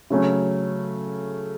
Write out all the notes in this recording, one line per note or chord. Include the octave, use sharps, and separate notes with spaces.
C#3 F#3 A3 C#4